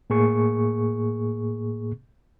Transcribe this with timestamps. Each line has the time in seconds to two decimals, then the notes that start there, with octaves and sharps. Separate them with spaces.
0.10 A2 A#3 G#4 C#6